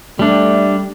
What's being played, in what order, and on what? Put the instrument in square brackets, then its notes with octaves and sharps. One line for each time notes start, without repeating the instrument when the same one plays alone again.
[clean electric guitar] G3 D4 [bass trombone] A3